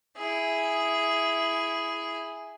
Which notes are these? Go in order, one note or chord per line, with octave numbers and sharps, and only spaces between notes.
E4 G#4